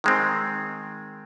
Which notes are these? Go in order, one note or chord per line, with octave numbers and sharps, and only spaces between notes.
D#3 G#3 C4